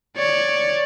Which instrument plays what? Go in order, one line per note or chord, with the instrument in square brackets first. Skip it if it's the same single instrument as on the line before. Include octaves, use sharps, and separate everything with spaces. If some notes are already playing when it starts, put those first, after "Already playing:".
[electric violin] C#5 D5